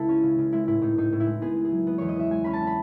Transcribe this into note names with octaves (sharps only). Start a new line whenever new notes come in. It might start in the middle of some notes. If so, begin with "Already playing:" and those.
Already playing: C#2 G#3 E4 A4
C#4
C#3
C#3
G#3 E4
A2 E4
A2 D#4
A2 D#4
A2
E4
G#3
B3 G#4
B3
G#4
F#3
B3
E2 C#5
D#5
B3 E5
G#3 G#5
C#4 B5
A5
C#4
B5